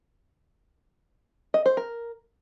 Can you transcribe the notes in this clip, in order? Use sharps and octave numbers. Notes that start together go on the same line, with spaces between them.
D#5
C5
A#4